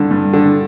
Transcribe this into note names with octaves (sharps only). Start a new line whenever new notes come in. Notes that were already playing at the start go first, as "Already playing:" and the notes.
Already playing: G2 D3
G2
D3